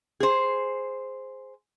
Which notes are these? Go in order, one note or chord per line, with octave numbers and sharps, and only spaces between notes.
G#4 C5